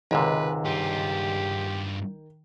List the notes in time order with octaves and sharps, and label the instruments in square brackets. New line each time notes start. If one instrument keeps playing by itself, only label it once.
[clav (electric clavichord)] C#2 G#2 C3 [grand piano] D#3 [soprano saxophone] B4
[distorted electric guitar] G2 F4 [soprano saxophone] G4